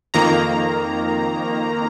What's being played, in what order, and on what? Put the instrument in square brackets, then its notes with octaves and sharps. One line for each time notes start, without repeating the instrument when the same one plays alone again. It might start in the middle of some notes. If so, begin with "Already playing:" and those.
[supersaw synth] F2 D#3 A#3 A#5